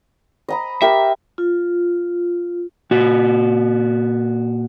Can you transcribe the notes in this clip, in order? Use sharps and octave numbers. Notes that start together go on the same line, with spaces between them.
D#5 A#5 B5
G4 A#4 E5
F4
A#2 F#4